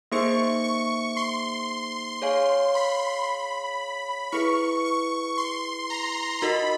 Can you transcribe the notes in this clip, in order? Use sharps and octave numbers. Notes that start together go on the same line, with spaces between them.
A#3 D#4 G#4 C5 E5 C#6
C#6
C6
G#4 C#5 F5 G#5
B5
E4 G#4 B4 C#6
C#6
C6
A#5
D#4 F#4 A#4 D#5 B5